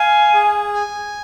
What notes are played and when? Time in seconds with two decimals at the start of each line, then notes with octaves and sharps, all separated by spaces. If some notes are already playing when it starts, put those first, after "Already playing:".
Already playing: F5 G#5
0.34 G#4
0.74 G#5